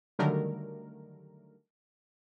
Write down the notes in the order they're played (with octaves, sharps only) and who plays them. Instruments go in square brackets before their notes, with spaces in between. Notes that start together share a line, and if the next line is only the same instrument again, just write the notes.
[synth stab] D3 D#3 F#3 G3 A3 A#4